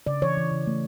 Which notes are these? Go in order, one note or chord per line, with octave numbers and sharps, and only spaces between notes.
C#3 D5
E3 C#5
E3
C#3
A3